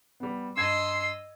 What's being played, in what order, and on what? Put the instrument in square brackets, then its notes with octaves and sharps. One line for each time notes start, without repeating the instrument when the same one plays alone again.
[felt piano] G3 B3
[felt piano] G2 G#6 E7 [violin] D#5 E6 [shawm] C6